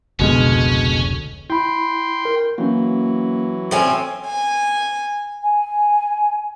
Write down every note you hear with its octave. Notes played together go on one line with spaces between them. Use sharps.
F1 C#2 B2 D3 G#3 C#4 F6
E4 G5 B5 C6
A#4
E3 F#3 A#3 C#4
A2 C4 C#4
G#5
G#5